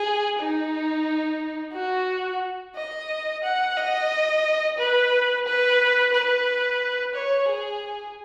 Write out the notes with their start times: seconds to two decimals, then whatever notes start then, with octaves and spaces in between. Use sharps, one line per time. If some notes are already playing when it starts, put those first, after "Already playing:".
Already playing: G#4
0.40 D#4
1.74 F#4
2.76 D#5
3.43 F#5
3.77 D#5
4.78 B4
5.46 B4
6.13 B4
7.15 C#5
7.48 G#4